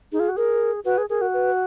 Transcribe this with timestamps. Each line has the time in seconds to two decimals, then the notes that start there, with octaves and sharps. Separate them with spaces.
0.12 D#4 G#4
0.20 F4
0.29 F#4
0.36 G#4 A#4
0.85 F#4 B4
0.98 G#4
1.09 G#4 A#4
1.21 F#4
1.34 B4